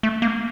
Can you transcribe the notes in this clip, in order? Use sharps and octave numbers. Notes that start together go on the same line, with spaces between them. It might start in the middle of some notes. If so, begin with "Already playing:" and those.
A3
A#3